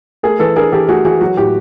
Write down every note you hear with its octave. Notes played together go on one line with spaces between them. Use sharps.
A3 G#4 A#4
E3 A4 B4
D4 G#4 A#4
E3 G4 A4
A3 F#4 G#4
E3 F#4 G#4
F#3 F#4
A2 G4